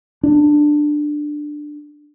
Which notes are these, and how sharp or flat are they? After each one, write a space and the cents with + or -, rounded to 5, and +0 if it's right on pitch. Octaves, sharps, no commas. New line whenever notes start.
D4 +15